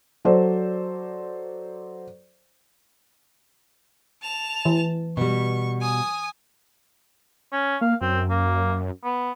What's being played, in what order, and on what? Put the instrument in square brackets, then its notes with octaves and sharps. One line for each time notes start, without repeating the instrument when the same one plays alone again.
[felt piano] F#3 A4 C5 D5
[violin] A5 F7
[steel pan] E3
[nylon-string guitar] B2 G3 [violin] C#6
[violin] G#5 D#6
[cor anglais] C#4
[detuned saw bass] A#3 [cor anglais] F5
[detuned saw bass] F#2 [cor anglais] C4
[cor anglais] A#3
B3